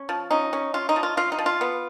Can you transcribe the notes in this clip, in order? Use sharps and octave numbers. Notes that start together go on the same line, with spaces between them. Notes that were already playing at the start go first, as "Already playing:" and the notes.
Already playing: C#4
F3
C#4 D#4
C#4
C#4 F4
D#4
F3
F4
F3 F4
D#4
F3
F4
B3